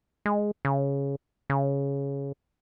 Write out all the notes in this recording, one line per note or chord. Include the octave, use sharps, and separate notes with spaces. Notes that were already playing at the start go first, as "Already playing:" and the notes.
G#3
C#3
C#3